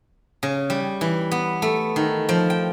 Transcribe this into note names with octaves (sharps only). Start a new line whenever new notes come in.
C#3
G3
E3
B3
A3
D#3
F3
G5